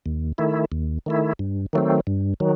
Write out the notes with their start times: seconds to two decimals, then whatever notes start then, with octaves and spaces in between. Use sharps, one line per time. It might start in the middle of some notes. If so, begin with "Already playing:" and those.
0.06 D#2
0.38 D#3 A3 E4
0.72 D#2
1.06 D#3 A3 E4
1.39 G2
1.73 D#3 F#3 A3 C4
2.07 G2
2.40 D#3 F#3